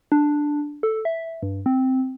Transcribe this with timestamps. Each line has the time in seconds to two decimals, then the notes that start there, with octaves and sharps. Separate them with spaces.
0.12 D4
0.83 A4
1.05 E5
1.43 G2
1.66 C4